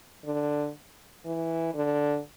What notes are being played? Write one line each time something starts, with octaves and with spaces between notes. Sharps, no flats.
D3
E3
D3